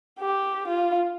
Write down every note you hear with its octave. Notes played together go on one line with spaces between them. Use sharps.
G4
F4